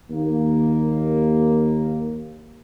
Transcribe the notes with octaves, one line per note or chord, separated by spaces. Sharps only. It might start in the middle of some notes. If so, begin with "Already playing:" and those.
D#2 A#3